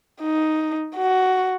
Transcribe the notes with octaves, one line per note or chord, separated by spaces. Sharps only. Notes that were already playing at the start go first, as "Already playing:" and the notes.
D#4
F#4